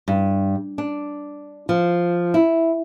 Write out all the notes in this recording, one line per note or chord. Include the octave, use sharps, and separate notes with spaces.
G2
D4
F3
E4